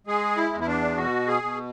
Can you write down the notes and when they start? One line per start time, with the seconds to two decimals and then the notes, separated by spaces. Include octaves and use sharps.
0.07 G#3 G#4
0.37 E4
0.53 E2
0.60 E4
0.67 D4
0.97 B2 F#4
1.27 G#4
1.42 B2